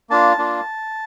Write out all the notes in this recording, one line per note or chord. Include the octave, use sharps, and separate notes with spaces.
A#3 D4 F4 A5
A#3 D4 F4